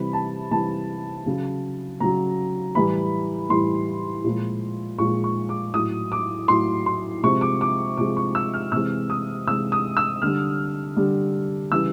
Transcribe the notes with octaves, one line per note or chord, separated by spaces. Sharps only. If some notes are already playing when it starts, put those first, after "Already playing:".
Already playing: C3 E3 G3 B5
A5
C3 E3 G3 A5
C#3 F#3
C#3 F#3 A#5
A2 E3 G3 B5
A2 E3 G3 C6
A#2 F3 G#3
A#2 F3 G#3 C#6
C#6
D6
A2 F#3 D#6
D6
A2 F#3 C6
C6
C3 F3 G#3 C#6
D6
D6
C3 F3 G#3 D6
C#6
E6
F6
C3 E3 G#3 E6
D#6
C3 E3 G#3 E6
D#6
E6
D3 G3 F6
D3 G3
C#3 E3 G3 E6